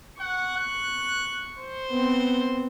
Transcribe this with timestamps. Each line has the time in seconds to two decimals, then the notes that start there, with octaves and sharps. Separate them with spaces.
0.20 F#5 C#6
0.57 F#6
1.58 C5
1.90 B3 C4